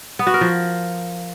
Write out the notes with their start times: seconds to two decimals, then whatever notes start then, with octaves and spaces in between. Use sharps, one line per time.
0.19 B3
0.27 F#4
0.34 A#4
0.41 F3